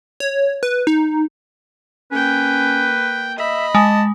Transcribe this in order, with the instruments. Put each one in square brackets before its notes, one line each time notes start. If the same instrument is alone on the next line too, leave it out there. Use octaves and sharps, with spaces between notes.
[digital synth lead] C#5
B4
D#4
[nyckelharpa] A#3 G5 [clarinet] C#4 [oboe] B4
[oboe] D#5 [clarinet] E5 [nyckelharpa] B5
[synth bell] G#3 [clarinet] A5